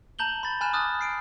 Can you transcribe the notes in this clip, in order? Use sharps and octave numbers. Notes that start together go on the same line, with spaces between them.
A5 A#5 G6 F#7 G7
B5 A6
G#5 A5 B5 F6 F#6 E7
B5 D6 D#6 F6 F#6 A6
F6 C7 D7